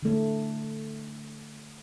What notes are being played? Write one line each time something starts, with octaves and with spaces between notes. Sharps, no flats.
D3 A3